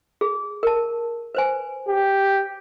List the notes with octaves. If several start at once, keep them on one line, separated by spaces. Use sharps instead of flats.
G#4
A#4 A5
B4 C5 G#5
G4